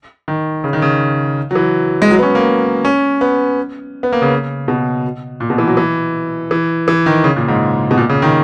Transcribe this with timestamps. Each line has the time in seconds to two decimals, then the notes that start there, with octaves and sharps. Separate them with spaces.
0.28 D#3
0.64 C#3
0.73 D#3
0.82 C#3
1.51 F#3
1.55 E3
2.02 G#3
2.11 F#3
2.19 B3
2.23 C#4
2.35 A#3
2.85 C#4
3.21 B3
4.03 B3
4.13 A#3
4.22 C#3
4.68 B2
5.40 A#2
5.50 B2
5.58 E3
5.68 F#3
5.77 E3
6.51 E3
6.88 E3
7.06 D#3
7.24 C#3
7.36 A#2
7.48 G#2
7.91 B2
7.97 A#2
8.09 C#3
8.22 D#3